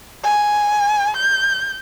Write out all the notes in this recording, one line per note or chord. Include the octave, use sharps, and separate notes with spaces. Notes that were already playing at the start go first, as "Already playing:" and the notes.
G#5
G6